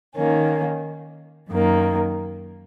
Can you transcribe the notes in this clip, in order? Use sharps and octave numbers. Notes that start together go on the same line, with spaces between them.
D#3 A#3 C#4
F#2 D#3 A#3